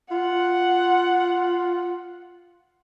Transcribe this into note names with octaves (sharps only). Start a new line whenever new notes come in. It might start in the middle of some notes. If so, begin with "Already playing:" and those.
F4 F#5